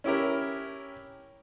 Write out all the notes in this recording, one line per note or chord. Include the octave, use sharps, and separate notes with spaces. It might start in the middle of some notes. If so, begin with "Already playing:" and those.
C#4 E4 G4 A#4